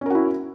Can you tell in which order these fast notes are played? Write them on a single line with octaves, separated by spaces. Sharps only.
C#4 A#4 F#4 E4